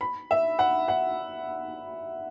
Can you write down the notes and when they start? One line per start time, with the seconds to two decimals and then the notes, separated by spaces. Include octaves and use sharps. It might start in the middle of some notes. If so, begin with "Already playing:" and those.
0.01 B5
0.31 E5
0.59 F#5
0.88 F#5